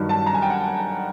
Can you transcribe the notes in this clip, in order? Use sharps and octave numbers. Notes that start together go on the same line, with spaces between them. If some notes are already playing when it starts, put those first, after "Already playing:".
Already playing: G2 D#3 F#3
A5
A#5
G#5
G5
F#5